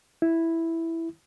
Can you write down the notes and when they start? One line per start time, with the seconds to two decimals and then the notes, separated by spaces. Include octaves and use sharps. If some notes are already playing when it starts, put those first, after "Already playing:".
0.22 E4